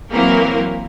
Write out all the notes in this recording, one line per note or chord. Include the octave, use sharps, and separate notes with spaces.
E3 F#3 A#3 C4 A#4